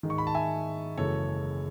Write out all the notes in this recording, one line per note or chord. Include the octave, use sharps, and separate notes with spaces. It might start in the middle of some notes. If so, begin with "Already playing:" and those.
G#2 D#3 G#3
C#6
B5
A5
E5 G#5
F#1 F#2 C#3 E3 G#3 A4 C#5